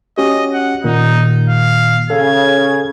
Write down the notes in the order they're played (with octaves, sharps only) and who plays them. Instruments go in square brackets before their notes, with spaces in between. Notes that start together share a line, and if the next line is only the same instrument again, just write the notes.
[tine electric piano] C#4 F#4 G4 [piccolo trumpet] D#5
[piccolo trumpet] F#5
[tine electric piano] A#2 D#3 [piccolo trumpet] D#4
[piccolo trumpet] F5
[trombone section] C#3 [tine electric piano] A4 F5 [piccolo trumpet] G#6